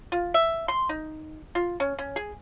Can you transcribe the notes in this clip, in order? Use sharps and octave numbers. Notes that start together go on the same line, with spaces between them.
F4
E5
C6
D#4
F4
C#4
C#4
G#4